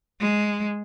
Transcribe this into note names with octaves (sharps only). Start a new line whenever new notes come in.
G#3